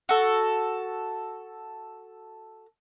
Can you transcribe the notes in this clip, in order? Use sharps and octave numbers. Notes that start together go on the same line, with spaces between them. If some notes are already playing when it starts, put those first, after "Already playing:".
F#4 A4